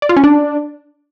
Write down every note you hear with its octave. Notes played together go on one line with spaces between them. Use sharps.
D5
F4
C#4
D4